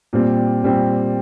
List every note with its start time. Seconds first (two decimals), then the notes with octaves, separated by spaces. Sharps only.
0.13 A#2 G3 C4
0.63 A#2 G3 C4